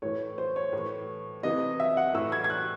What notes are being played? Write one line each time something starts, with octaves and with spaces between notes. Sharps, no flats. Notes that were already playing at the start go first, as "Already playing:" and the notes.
A2 E3 C#5
C5
C#5
A2 E3
C3 E3 D#5
E5
F#5
A2 E3 E6
G#6
G#6
F#6